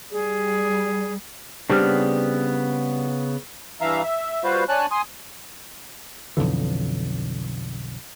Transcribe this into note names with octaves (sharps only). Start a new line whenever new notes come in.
G3 G#4
C#3 G3 B3 C4 D4 F6
G2 E3 E5 F5 A#5
E5
G3 F4 F#4 B4 C5 F5
D4 C#5 G#5 A5 F#6
G#5 C6 D#6
B1 F2 D3 E3